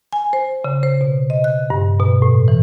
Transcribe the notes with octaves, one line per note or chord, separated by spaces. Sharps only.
G#5
C5
C#3
C5
B2
D#5
F#6
G2
B2
A2
E3